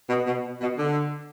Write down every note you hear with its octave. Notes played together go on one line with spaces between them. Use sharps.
B2
B2
B2
D3